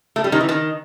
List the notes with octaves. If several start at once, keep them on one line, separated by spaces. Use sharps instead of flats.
A3
G3
D#3
E3
D#3